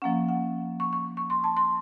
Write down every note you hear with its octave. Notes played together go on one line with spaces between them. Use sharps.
F3 A#3 C#4 F#5
F#5
C#6
C#6
C#6
C6
A5
C6